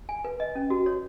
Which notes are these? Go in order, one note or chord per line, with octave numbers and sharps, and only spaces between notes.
G#5
B4
D#5
C#4
F#4
C#5